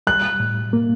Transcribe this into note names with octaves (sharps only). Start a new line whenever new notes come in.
G3 F#6
A2
A#3